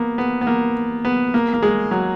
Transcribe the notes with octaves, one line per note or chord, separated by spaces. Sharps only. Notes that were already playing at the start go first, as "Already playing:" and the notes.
Already playing: A#3 B3
B3
B3
A#3
B3
A#3
A#3
G#3
F#3